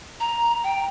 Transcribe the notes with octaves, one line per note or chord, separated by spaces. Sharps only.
A#5
G5